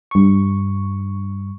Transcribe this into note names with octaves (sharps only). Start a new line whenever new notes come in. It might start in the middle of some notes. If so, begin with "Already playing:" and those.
G2 C#6